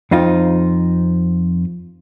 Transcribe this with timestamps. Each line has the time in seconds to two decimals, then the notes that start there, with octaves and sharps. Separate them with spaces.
0.11 F2 C4 D#4 F4